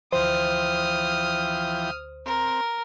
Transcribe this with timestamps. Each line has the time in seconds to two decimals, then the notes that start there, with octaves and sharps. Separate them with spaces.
0.13 D2 E3 F3 C5 G5 D#6 F6
2.26 C4 A#4